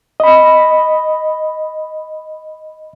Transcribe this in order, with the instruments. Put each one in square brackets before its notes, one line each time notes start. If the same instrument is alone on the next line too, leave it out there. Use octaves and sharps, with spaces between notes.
[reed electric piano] D#5 B5